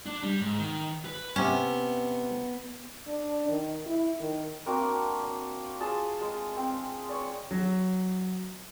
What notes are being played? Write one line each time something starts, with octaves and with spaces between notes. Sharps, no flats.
D4
G3
G#2
D#3
B4
C3 B3 C#4
D4
D#3
E4
D#3
A#3 C4 D4 F#4
C6
F4 G#4 A5
G#3 C6
C4
C#5 D5
F#3